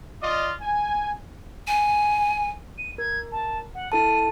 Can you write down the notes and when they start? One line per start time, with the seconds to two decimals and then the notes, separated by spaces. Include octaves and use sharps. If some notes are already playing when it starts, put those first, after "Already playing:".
0.22 F4 D5 D#5
0.61 G#5
1.67 G#5
2.78 D#7
2.98 A#4 G#6
3.32 A5
3.75 F#5
3.92 E4 A4 A5 D#7